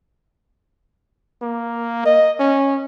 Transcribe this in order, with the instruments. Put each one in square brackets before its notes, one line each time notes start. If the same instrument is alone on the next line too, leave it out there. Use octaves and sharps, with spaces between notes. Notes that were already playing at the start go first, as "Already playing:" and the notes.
[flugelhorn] A#3
D#5
C#4